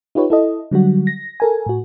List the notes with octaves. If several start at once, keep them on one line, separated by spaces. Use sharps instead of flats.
D#4 F4 G4 B4 C#5
E4 A4 D#5
D3 F#3 G3 F#4
A#6
A4 A#4 G#5
A2 F#4